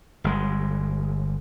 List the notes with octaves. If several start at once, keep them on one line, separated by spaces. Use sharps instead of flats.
G1 G#3